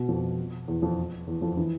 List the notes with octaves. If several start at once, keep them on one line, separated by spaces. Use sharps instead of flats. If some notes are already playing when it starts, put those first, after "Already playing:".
Already playing: B2
F2
E2
F2
E2
F2
E3